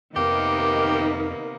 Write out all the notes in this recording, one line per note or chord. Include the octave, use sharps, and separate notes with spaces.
F2 C3 D#3 A#3 B3 D#4 G4 A#4